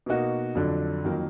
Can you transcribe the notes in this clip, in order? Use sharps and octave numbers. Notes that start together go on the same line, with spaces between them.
B2 A#3 D#4 F#4
F2 D3 F#3 D4
F2 D#3 F#3 A#3